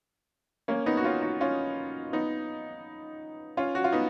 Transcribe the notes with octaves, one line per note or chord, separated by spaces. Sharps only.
A#3 C#4
B3 D#4
F#4
C#4 F4
D#4 F#4
C#4 F4
B3 D#4
C#4 F4
F#4
F4
B3 D#4